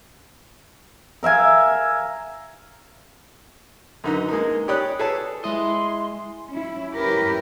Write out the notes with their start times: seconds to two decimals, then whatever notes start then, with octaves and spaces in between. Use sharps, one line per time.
1.23 A#4 E5 F5 G#5
4.04 F#2 D3 D#4 B4 A#5
4.29 G#3 A#3 D#4
4.68 G4 C#5 D5 B5 D#6 F#6
4.99 G#4 A4 B4 C#5 G#5 A5
5.44 G#3 E4 D#5 C6
6.50 C#4 E4
6.93 C#4 E4 G4 A#4 B4